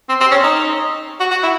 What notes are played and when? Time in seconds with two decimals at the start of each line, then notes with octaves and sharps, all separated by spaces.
0.09 C4
0.20 C4
0.32 C#4
0.43 D#4
1.20 F#4
1.31 F#4
1.43 E4